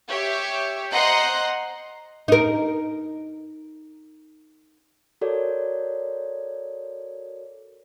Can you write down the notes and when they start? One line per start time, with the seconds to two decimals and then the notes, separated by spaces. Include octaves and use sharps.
0.10 G4 C#5 E5
0.93 C5 D#5 F#5 A#5 C6 F#6
2.28 D#4 A#4
5.21 F#4 A4 A#4 C#5 D5